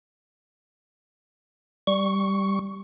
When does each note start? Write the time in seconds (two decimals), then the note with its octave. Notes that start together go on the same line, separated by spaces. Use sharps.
1.87 G3 C#6